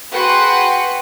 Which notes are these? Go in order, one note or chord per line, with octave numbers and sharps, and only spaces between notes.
F#4 G#4 B4 F#5 G5 C6